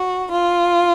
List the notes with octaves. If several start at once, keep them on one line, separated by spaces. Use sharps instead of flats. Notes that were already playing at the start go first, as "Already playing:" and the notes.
Already playing: F#4
F4